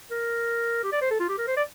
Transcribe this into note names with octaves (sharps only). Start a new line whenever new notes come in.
A#4
G4
D5
C5
A4
F4
G4
A#4
C5
D5